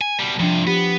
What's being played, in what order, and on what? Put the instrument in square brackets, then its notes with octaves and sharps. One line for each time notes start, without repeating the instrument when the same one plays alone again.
[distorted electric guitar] G#5
B2 G3
[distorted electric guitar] G2 C3 [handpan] F3 D4
[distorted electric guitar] B3 [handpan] G4